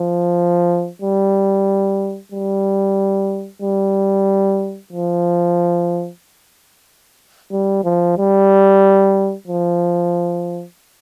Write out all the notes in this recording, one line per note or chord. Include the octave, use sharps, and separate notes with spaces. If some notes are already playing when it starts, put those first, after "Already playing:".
Already playing: F3
G3
G3
G3
F3
G3
F3
G3
F3